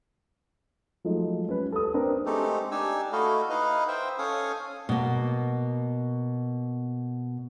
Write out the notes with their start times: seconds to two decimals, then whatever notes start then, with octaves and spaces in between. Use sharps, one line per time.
1.04 F3 F#3 G#3 A3 D#4
1.49 C#4 B4
1.72 A4 D#6
1.94 A#3 C4 D4 A#4 B4
2.26 G#3 A3 C4 D#4 G4 A4
2.71 D4 D#4 G4 G#5 E6
3.13 A3 E4 F#4 A4 D#5 F5
3.50 D#4 E4 B4 D#5 F5
3.88 C5 E5 G5
4.19 C#4 A4 F5 G#5 D#6
4.89 B2 A#3